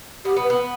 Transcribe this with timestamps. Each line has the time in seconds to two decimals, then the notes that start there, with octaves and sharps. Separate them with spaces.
0.25 B3 G4
0.36 B3
0.44 B4
0.50 B3